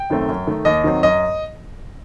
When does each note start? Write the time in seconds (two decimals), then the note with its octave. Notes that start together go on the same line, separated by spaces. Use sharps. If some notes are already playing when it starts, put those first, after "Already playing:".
Already playing: G5
0.10 F#2 D#3 A3 C4
0.29 F#2
0.47 D#3 A3
0.65 D#2 D#5
0.84 D#3 F#3 C4
1.03 F#2 D#5